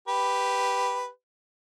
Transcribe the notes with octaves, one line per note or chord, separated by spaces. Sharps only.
G4 B4